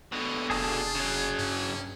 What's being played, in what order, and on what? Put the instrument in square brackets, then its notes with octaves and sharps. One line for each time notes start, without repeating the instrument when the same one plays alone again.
[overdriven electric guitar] B2 D3 [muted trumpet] D#5
[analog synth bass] F1 [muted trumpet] F4 [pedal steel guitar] G#4 A5 D#6
[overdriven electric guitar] C#3 F#3
[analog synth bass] G2 [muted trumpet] C#4